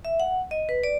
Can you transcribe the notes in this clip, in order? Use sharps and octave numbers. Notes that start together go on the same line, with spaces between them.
E5
F#5
D#5
B4
D5